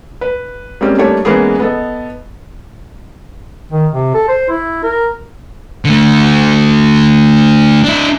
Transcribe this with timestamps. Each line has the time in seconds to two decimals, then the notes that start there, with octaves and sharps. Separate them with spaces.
0.21 B4
0.81 G3 G#3 A#3 C4 C#4
0.98 G3 A3 A#3 D4 C#5 D5
1.25 E3 G#3 A#3 B3 C#4 G#4
1.60 B3 A4 D#5
3.72 D#3
3.92 C3
4.14 A4
4.29 C5
4.50 E4
4.83 A#4
5.85 D3 A3
7.84 D4 E4